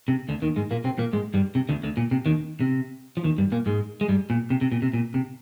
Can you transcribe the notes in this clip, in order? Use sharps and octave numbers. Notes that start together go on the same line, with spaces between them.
C3
D2 D3
D#2 D#3
G#2 G#3
A#2 A#3
C3 C4
A#2 A#3
G#2 G#3
G2 G3
C3
D2 D3
D2 D3
A#2
C3
D#2 D#3
C3
F3
D#2 D#3
G2 G3
A#2 A#3
G#2 G#3
G#3
G2 G3
A#2
C3
C3
A#2
C3
A#2
C3